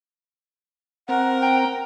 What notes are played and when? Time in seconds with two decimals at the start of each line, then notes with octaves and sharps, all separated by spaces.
1.09 C4 A#4 F#5
1.42 G5 A#5